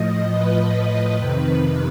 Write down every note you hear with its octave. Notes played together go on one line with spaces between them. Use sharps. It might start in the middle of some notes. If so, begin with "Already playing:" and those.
Already playing: A2 F3 D#5
B4
F2 C3 D#3